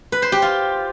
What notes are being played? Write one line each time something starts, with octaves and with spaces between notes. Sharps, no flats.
B4
C5
G4
F4